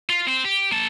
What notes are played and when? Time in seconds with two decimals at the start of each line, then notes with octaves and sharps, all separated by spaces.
0.10 F4
0.27 C4 C5
0.45 G4
0.72 A#3 A5